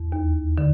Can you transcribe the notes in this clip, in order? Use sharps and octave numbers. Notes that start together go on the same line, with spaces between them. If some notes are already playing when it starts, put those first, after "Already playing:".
Already playing: E2
D#2
D3